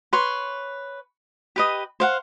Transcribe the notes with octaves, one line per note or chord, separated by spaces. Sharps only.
B4 C#5 C6
G4 B4 D#5
C5 F5 F#5